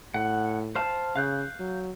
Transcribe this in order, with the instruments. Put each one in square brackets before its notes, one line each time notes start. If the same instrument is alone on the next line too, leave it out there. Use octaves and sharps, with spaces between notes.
[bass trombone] A2 [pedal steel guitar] F#5
[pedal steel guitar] C5 F5 A5
[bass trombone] C#3 [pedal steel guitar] F5 F#6 G6
[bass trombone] F#3